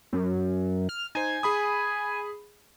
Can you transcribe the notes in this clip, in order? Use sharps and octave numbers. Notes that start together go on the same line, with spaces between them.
F#2
F6
D#4 C5 G#5
G#4 B5 D#6